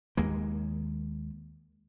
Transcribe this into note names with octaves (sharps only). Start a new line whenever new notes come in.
D#2 G#3 A#3